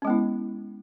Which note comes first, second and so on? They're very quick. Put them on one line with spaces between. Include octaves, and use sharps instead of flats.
C#4 G#3 B3 E4